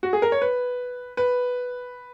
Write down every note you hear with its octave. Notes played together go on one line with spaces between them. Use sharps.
F#4
G#4
A#4
C#5
B4
B4